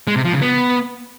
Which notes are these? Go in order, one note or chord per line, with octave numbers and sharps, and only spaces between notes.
G#3
C3
F3
C#3
B3